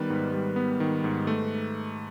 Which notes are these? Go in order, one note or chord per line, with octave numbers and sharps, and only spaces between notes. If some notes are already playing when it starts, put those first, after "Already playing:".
Already playing: D#3 G3 B3 B4
G#2
G3
B3
D#3
G#2
A3